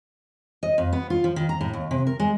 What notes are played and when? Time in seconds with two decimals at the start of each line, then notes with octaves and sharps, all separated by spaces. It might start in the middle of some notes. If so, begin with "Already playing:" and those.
0.63 D#5
0.78 F2
0.92 B3
1.10 F4
1.24 F3
1.36 D#3
1.49 A#5
1.61 A2
1.73 D#2
1.91 C3
2.07 A#4
2.20 G#3